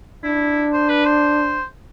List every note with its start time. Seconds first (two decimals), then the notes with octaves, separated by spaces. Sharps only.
0.24 D4 E4
0.73 C5
0.89 B4
1.05 C5